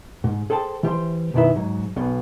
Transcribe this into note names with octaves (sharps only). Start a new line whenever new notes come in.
G#2
G#4 A4 C5 G5 A5
E3 G4 C5 C6
B1 F#2 D#3 E4 B4 E5
G#2 F#3
B1 B2